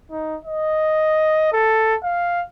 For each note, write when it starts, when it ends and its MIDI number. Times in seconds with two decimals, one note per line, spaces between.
0.11 0.36 63
0.45 1.52 75
1.52 1.96 69
2.03 2.43 77